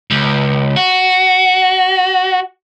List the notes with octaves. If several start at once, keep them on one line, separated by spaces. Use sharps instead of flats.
C#2
F#4